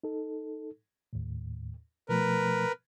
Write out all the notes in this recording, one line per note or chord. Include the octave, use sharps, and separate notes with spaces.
D#4 A4
D#2 A2
B2 F3 A3 A#4 B4